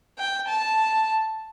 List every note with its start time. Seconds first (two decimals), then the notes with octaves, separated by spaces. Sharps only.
0.19 G5
0.48 A5